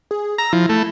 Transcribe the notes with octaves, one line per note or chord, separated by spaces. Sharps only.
G#4
A#5 E6
F3 E4
A3